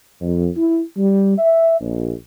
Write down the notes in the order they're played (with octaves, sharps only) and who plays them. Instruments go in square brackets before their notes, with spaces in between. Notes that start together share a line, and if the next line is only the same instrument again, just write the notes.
[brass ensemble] F2
E4
G3
E5
A#1